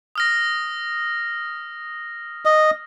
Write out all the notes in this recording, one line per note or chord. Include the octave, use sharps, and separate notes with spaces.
D#6 F6 A#6
D#5